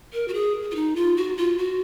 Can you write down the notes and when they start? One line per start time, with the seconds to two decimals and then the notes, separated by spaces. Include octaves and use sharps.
0.13 A#4
0.28 F#4
0.34 G#4
0.71 F4
0.75 D#4
0.96 F4
1.17 F#4
1.37 F4
1.58 F#4